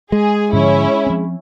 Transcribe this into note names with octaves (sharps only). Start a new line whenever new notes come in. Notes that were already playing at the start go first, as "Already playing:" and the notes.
G#3 G#4
G#2 D3 F3 C#4 E4
F3 C4